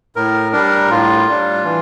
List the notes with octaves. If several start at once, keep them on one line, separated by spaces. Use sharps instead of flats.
A2 A#4
G3 D4 A#4
A2 F4
G3 D4
E3